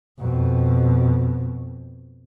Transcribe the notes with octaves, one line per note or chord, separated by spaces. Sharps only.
F2 B2